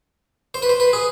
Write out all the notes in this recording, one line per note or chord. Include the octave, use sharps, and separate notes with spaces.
C5
B4
C5
B4
G#4